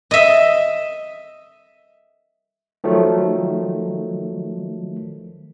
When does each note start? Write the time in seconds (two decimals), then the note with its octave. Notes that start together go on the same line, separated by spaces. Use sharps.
0.11 D#5 E5
2.84 D#3 F3 F#3 A3